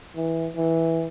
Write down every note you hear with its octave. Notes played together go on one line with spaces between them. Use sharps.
E3
E3